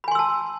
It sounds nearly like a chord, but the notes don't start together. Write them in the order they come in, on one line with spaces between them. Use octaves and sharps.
B5 G#5 C6 E6 A5